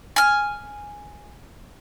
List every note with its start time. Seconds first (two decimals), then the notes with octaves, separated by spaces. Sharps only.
0.16 G#5 F6